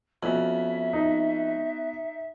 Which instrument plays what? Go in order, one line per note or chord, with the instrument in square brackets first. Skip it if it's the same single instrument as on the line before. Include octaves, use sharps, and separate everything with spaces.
[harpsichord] F2 [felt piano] B3 C#4 F#4 [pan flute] E5
[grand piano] D#4